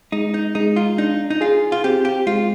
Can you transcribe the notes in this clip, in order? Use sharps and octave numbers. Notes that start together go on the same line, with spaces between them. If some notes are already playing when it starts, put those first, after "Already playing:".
G#3 D#4
D#4
G#3 D#4
F4
D4 D#4
D#4
F4 G#4
F4
C4 G4
G4
G#3 F4